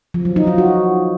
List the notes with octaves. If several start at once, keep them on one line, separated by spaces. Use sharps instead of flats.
F3
F#3
D#4
F4
F#4